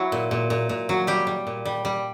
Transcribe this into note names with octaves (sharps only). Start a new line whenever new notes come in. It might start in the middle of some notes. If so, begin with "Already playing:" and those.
Already playing: F#3 E4
A#2
A#2
A#2
A#2
F#3
G3 G4
G3
A#2
G3
G3